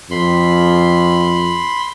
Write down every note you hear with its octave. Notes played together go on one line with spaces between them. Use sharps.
F2 B5 C6